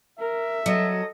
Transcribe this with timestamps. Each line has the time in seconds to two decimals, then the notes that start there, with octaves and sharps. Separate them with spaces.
0.19 A#4 E5
0.66 F#3 A4 D#5